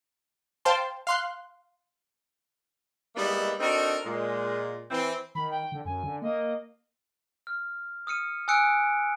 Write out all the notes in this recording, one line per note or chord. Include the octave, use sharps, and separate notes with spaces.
C5 F5 G5 A5 C6
F5 C6 F#6
G3 G#3 A#3 B3 D#4 E4
C4 D4 D#4 F#4 A4 A#4
A#2 G#3
E3 C4
D#3 B5
G5
D3
F#2 G#5
D3
A#3 D#5
F6
D#6 F6 C#7 D#7
G#5 D#6 E6 F#6 C#7 D7